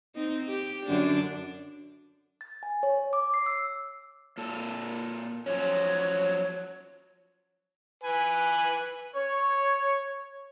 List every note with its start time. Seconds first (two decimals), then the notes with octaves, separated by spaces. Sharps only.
0.16 C4 D#4
0.48 G4
0.86 F#2 D3 D4
2.41 A6
2.63 G#5
2.83 C#5
3.13 D6
3.34 C7
3.46 E6
4.38 A#2 A4
5.46 F3 F#3 C#4 C#5
8.03 B4 G#5
9.15 C#5